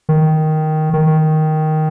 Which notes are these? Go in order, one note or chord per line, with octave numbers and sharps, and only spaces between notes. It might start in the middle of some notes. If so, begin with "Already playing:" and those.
D#3
D#3